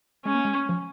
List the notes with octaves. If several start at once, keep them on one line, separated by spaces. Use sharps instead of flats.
G#3 C#4
A#3
G#3
F3